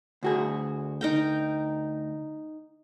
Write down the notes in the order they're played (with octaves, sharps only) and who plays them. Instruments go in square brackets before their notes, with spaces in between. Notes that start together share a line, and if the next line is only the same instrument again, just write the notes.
[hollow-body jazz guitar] D2 F#4 G#4
[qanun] D#4 A#4 G5